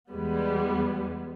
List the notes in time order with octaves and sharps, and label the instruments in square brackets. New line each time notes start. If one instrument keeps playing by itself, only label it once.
[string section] E2 G3 G#3 B3